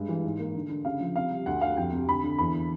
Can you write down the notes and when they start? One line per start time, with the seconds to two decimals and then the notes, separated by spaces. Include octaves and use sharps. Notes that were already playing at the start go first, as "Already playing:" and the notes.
Already playing: G2 G#3
0.09 E3
0.24 G#2
0.39 A#3
0.55 D3
0.70 D3
0.85 C#3 F5
1.00 F3
1.16 C3 F5
1.31 G3
1.46 D2 F#5
1.61 D2 F5
1.77 F2 G5
1.93 C3
2.08 D3 B5
2.23 D3
2.38 E2 B5